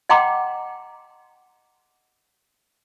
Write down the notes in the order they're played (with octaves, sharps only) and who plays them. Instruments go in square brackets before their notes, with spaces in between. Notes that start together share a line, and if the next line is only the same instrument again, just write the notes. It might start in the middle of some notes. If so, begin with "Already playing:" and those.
[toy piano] D#5 F#5 G5 A#5 C6 D6